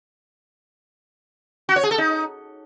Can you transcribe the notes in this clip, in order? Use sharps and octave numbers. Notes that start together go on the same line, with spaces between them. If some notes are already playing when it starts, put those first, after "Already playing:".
F#4
C#5
G#4
A4
D#4